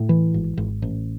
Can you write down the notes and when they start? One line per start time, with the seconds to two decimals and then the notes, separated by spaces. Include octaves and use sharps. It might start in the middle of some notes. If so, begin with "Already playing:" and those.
Already playing: A2
0.09 E3
0.34 G#1
0.57 G#1
0.82 A1